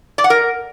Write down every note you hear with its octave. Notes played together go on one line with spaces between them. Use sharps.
D5
F#5
A#4